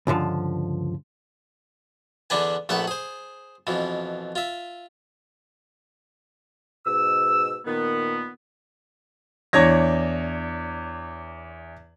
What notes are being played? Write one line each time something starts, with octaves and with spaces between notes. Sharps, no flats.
C#2 G2 D3 F3
E2 D3 D4 B4 G#5
A#1 A3 B3 B4 F#5
G#4 C5
F2 B2 E3
F4 E5
G#2 B2 E6
A#2 D#3 B3
E2 D4 C#5 G#6 A#6